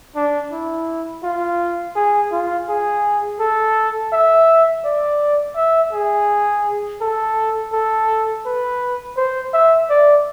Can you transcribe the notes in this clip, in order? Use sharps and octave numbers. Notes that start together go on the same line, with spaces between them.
D4
E4
F4
G#4
F4
G#4
A4
E5
D5
E5
G#4
A4
A4
B4
C5
E5
D5